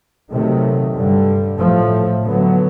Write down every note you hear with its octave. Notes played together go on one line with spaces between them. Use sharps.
C3 D#3 F#3 A3
G2 D3 G3
A2 F3 A3
D3 F#3 B3